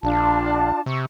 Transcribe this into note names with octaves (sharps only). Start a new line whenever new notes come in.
A#1 D4 F4 A5
C3 C#6 E6